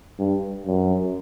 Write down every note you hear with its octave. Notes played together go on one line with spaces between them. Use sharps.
G2
F#2